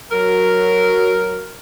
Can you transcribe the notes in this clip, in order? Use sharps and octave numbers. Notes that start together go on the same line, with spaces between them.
F#3 A#4